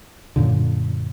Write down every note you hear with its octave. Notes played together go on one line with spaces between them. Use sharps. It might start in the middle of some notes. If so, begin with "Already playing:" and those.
F#2 A#2 D3